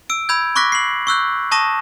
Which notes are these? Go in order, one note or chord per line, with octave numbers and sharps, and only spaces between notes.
E6 D7
B5 E6 G6 G#6
B5 C#6 D6 F#6 A#6 B6
C7 F#7
C#6 E6 F#6 G6
A5 C#6 D#6 A#6 E7